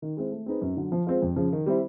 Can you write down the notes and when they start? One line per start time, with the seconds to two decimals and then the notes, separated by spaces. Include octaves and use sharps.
0.02 D#3
0.17 G#3 C4 E4
0.32 A3
0.46 C4 D#4 G#4 B4
0.61 F#2
0.77 D3 F#3
0.92 F3
1.07 G#3 C4 F4
1.22 F2
1.36 C#3 F3
1.52 D#3
1.66 G3 C4 E4